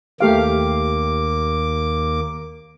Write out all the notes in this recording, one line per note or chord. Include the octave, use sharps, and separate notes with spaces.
D#2 A3 A#3 G4 F5 D6